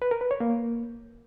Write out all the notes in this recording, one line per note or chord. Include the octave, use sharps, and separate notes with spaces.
B4
A#4
B4
C#5
A#3